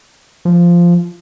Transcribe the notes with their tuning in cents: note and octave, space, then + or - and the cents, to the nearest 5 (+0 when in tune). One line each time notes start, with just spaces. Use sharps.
F3 -10